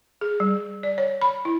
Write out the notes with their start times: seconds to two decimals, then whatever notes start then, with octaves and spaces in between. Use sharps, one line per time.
0.21 G#4
0.40 G3
0.83 D5
0.98 C#5
1.22 B5
1.45 E4